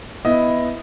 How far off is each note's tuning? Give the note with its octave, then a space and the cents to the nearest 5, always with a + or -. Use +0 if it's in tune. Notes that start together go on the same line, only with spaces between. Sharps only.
B3 +0 E4 +0 D#5 +5